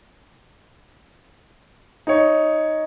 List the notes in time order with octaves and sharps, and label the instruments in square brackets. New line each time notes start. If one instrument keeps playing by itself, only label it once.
[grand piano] D#4 C#5